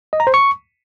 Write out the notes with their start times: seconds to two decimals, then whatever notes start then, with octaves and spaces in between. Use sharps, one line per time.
0.13 D#5
0.20 A#5
0.27 C5
0.34 C#6